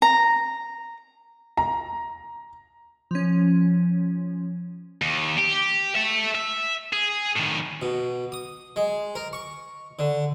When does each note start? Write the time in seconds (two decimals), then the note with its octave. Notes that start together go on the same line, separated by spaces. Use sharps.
0.02 A#5
1.57 A#5
3.11 F3 C#4
5.02 D#2
5.38 G4
5.95 A4 E5
6.35 E5
6.93 G#4
7.37 A2 D#3
7.82 B2
8.32 D#6
8.76 G#3
9.15 A#4
9.33 C#6
9.99 D3